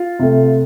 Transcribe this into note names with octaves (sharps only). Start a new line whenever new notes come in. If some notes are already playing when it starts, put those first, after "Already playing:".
Already playing: F4
C3 A3